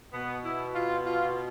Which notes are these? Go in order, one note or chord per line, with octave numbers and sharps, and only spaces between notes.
B2 B3
E4
F4
F4